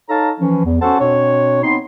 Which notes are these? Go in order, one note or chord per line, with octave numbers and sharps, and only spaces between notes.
D#4 A4 C#5 F5 A5 A#5
E3 F3 C#4
E2
C#4 F#4 A4 C5 F#5 A5
B2 C4 D4 C#5
B3 C4 D#4 C6